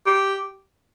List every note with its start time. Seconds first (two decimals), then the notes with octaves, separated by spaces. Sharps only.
0.06 G4